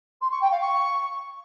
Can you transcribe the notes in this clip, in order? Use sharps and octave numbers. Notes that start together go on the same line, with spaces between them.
C6
C#6
G5
F5
C#6